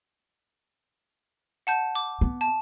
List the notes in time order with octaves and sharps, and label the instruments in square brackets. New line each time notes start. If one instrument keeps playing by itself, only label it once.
[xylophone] F#5 A5 G6
D6
[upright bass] B3
[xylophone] A5